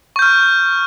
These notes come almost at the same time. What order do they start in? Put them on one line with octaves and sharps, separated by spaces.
C#6 G6 F6